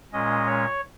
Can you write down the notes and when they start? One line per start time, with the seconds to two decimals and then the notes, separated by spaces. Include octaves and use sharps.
0.13 A#2 G#3 C#4 D#5
0.47 C#5